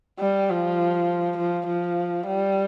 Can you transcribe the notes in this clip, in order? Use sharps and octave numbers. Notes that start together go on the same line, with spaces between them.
G3
F3
F3
F3
G3